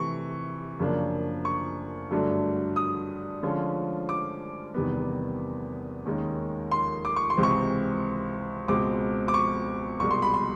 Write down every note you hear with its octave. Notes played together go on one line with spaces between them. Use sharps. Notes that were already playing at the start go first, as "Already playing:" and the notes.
Already playing: C3 E3 A3 C#6
F#2 C#3 F3 A#3 D4
C#6
G2 D3 F#3 A3 D4
D#6
D3 F3 G#3 C#4 F4
D6
E2 C3 D#3 G3 B3
D#2 D#3 G#3 C#4
C6
D6
C#6
C6
C#2 C3 E3 G#3 C4
C#6
C#2 B2 G#3 C4 D6
D6
C#6
C2 B2 G#3 C#6
C6
B5
C6